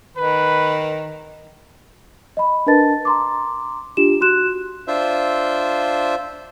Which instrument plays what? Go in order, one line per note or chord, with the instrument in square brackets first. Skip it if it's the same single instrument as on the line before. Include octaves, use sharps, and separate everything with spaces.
[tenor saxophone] D#3 [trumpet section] B4
[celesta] D#5 B5
D4 A#4 B4 D#5 A5 A6
A#5 C6 D6
D4 F4 G4 E7
F#4 C6 F#6 E7
[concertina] D4 F4 C5 E5